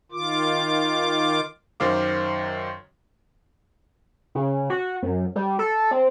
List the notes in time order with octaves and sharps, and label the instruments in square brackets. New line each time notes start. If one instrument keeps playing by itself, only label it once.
[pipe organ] D#3 F4 D6
[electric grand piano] F#2 D#3 C5 F5 D6
[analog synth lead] C#3
F#4
F#2
G3
A4
C4